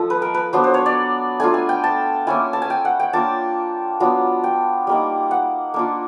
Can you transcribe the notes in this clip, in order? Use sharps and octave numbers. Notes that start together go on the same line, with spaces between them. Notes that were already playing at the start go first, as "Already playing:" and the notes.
Already playing: F3 G#3 A4
B4
A#4
B4
F#3 B3 D4 C5
C5
C#5
D5
A3 D4 F4 G#5
G#5
G5
A5
A#3 C#4 E4 G#5
A5
G#5
G5
F#5
G5
A#3 D4 F4 A5
F#3 B3 D4 F4
G5
G3 A#3 D#4
F#5
A#3 D4 F4